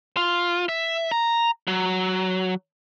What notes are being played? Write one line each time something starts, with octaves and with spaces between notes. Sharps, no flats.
F4
E5
A#5
F#3